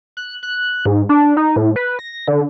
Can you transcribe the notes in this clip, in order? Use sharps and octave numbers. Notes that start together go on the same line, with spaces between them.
F#6
F#6
G#2
D4
D#4
A2
B4
A#6
D3